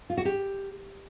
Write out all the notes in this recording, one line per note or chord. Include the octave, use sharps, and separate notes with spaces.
F4
F#4
G4